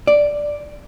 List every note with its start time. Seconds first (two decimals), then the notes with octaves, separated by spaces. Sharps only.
0.07 D5